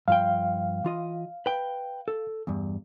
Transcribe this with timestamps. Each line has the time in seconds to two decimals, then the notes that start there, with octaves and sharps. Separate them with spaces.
0.08 G2 F3 F5 G5
0.84 E3 F4 D#5
1.46 B4 G5
2.08 A4
2.47 E2 G2